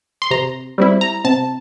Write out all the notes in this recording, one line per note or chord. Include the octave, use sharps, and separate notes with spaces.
C6
C3 A#5
G3 C4 E4
A#5
C3 A5